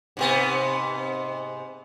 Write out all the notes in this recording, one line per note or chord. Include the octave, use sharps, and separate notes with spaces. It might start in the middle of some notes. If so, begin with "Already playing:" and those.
G#2 C3 B3